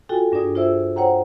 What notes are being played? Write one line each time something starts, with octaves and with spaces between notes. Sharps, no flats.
F4 F#4 A4 G5 G#5
G2 D4 F#4 G#4 D5 D#6
F4 G#4 C5 D5 E5 E6
C5 C#5 F#5 G5 A#5